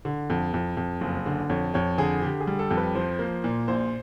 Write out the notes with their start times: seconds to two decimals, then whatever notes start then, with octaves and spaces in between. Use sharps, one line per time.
0.05 D3
0.30 F2
0.54 F2
0.77 F2
1.01 F#1
1.26 D3
1.50 F2 C#5
1.74 F2 C#5
1.98 D3 G#4
2.22 D3 G4
2.40 G#4
2.47 G3
2.59 A4
2.71 F2
2.77 B4
2.95 F3 C5
3.19 A#3
3.44 A#2
3.68 A#1 C5